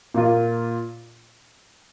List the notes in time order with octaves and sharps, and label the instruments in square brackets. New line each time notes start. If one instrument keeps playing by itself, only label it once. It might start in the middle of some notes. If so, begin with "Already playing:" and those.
[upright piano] A#2 A#3 F4